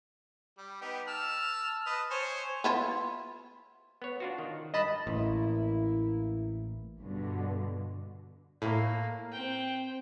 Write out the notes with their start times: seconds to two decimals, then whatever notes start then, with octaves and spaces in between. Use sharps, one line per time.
0.58 G3
0.81 B3 D#4 G4
1.07 A5 E6 F6
1.86 B4 D#5 A5
2.11 C5 C#5 G#5
2.64 B3 E4 F4
4.02 B3 C#5
4.20 D4 F4 F#4
4.38 D#3
4.74 G2 D#5 A5 B5
5.07 A1 A#3 E4
7.00 G2 B2 D3
8.62 A2 A#3
9.32 C4 G5